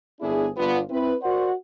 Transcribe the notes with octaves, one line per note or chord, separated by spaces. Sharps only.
G1 B3 D4 E4 G#4
G1 B3 D4 F4
C4 E4 B4
F#4 A#4 C5 D5 F#5